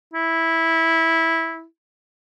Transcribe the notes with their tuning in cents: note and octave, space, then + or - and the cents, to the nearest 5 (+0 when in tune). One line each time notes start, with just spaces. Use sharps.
E4 -10